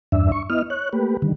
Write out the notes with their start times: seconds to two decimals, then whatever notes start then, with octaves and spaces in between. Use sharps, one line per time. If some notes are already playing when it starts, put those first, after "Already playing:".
0.12 E2 G2 D4 E5
0.32 C#6
0.50 B3 E4 D#5 F6
0.70 C#5 F#6
0.93 A3 A#3 G4 B4
1.22 D3 D#3 G3